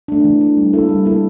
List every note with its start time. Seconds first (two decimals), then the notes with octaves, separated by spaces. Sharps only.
0.08 A3 D4
0.24 E3
0.41 A3 D4
0.57 G3
0.73 A#3 E4 A4
0.89 G3
1.05 A#3 E4 A4